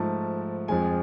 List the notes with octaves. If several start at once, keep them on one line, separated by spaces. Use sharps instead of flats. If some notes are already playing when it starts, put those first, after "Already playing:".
Already playing: G#2 F3 A3 A5
F2 F3 G#3 G#5